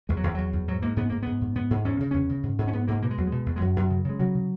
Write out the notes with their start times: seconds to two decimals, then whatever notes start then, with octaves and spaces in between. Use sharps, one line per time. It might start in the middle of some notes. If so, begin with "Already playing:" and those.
0.09 E2 G#3
0.17 F#3
0.24 E2 E3
0.35 E2 F#3
0.53 E2
0.68 G#2 F#3
0.82 G#2 A#3
0.96 G#2 B3
1.09 G#2 A#3
1.23 G#2 B3
1.41 G#2
1.55 G#2 B3
1.70 G#2
1.85 E2 C#4
2.00 C#3
2.11 E2 C#4
2.29 C#3
2.43 G#2
2.58 G#2
2.68 C#4
2.73 G#2 B3
2.88 G#2 A#3
3.02 B2 A#3
3.11 G#3
3.18 E2 F#3
3.27 B2 G#3
3.46 E2
3.56 G#3
3.61 F#2 F#3
3.76 F#2
3.90 C#3
4.05 C#3 G#3
4.19 C#3 F#3
4.35 C#3